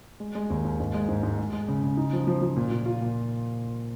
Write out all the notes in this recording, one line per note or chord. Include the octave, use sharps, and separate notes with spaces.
G#3
G#3
D#2
D#2
G#2
G#3
G#2
G#2
G#3
G#3
C#3
C#3
D#4
F3
F3
F3
A#2
A#2
F4
A#2